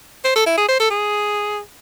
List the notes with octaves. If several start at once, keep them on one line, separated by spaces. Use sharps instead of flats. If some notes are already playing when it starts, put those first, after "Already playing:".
C5
A4
E4
G#4
C5
A4
G#4